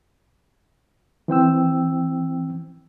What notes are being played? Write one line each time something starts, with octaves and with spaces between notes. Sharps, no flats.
E3 C4 G5 E6